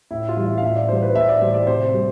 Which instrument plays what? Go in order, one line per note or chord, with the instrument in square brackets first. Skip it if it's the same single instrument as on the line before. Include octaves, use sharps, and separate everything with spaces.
[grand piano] A2 E4
F4
E3 G3
E5
F5
A2 E5
D5
E3 G3 C5
B4
A2 E5
D5
E3 G3 C5
D5
C3 C5
G3